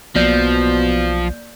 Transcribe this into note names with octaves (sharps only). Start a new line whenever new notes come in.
B1 B2 F3 A#3 D5 G6